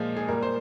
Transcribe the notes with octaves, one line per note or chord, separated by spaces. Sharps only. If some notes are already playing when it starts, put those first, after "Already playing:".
Already playing: A#2 F3 G#3
G#4
A#2 G3 A#4
C5